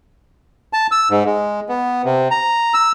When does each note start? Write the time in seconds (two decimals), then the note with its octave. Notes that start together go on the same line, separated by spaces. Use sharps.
0.73 A5
0.91 E6
1.11 G#2
1.26 G#3
1.69 B3
2.05 C3
2.31 A#5
2.74 E6